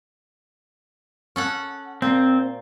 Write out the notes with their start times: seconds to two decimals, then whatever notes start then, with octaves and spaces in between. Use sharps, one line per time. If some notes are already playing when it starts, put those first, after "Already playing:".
1.36 C#4 A4 F#5
2.02 A#2 C4